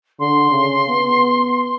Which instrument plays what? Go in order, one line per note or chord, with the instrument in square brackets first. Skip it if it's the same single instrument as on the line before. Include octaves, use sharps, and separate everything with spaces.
[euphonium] D3 [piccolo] C6
[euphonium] C#3
B3